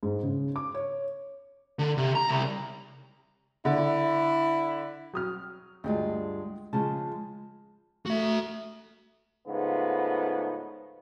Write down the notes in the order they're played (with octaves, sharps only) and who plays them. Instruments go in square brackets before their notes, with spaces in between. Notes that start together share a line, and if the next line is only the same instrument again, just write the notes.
[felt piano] G#2
C#3
D6
C#5
[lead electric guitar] D3
C3
A#5
C2
[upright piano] D3 [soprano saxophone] E4
[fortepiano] F#3 D#6 F6
[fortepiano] D2 [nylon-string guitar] G2 G#3 F4
[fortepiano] C#3 [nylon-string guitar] F3 G#3 A5
[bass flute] A3 [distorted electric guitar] F#4 E5
[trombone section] G#2 C#3 F3 A3 B3